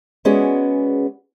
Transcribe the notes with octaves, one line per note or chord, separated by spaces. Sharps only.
G#3 B3 C#4 F#4 G#4 D5